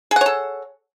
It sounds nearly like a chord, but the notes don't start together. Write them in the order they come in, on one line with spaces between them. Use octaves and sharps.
G#4 F#5 C#5 A4